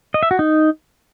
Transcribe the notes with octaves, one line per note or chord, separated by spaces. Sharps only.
D#5
E5
F#4
D#4